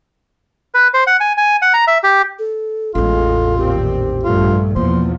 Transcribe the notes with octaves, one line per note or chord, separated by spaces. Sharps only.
B4
C5
F#5
G#5
G#5
F#5
A#5
E5
G4
A4
A1 E2 A2 G#3 F4 A4
A#2 D#3 C4 G4
A#1 G2 A3 F4
E2 B2 F3 A#3 C5